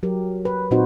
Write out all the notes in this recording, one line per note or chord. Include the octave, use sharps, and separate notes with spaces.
F#3 G4 A#4
B4
A#2 C4 D#4 F#4 C5